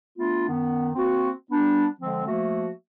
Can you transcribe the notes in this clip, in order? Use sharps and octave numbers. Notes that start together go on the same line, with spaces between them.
A3 B3 D4 F4
F#2 D#3 B3
A#3 C4 F#4
G3 B3 D4
D3 F3 G#3 C4
F3 A3 A#3 F#4 E5